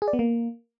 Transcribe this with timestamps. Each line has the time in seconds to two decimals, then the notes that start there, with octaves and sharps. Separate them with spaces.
0.02 G#4
0.08 D5
0.13 B3
0.19 A#3